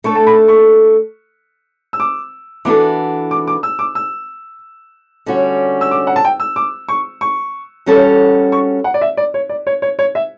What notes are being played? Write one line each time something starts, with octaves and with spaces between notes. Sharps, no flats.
A3 D4 A4 C#6
A5
B5
C#6
E6
D6
E3 B3 D4 F#4 A4 D6
D6
D6
E6
D6
E6
D3 G3 C#4 F#4
E6
D6
F#5
A5
G5
E6
D6
C#6
C#6
G3 C#4 F#4 A4
C#6
F#5
D5
E5
D5
C#5
D5
C#5
C#5
C#5
E5